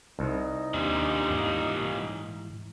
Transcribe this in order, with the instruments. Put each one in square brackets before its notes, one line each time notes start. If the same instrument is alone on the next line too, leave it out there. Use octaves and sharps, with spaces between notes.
[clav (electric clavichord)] C2 [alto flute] D#4
[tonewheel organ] D#2 D4 C6 [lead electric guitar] A#2 G3
[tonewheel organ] G#2 E3